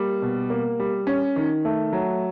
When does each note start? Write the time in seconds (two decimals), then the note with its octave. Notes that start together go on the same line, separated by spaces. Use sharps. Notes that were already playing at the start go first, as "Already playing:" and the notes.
Already playing: G3 A#3
0.22 B2
0.50 A#3
0.79 G3
1.07 C#4
1.36 D#3
1.65 A3
1.93 F#3